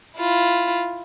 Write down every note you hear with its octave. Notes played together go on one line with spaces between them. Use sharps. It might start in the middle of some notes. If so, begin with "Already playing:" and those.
E4 F4